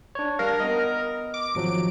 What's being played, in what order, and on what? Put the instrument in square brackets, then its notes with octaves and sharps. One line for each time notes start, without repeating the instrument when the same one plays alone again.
[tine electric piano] D4 C#5
[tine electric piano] G3 D4 F5 [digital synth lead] A#4
[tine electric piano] B3 D#5
[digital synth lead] D6
[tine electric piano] G#1 F3 F#3 [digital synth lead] D7